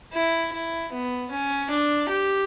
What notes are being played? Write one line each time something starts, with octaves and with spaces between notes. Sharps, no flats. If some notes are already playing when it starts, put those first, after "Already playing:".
E4
E4
B3
C#4
D4
G4